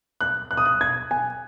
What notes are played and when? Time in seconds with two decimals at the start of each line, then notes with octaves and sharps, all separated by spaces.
0.21 F#6
0.51 F#6
0.57 D#6
0.65 F#6
0.81 G#6
1.11 G#5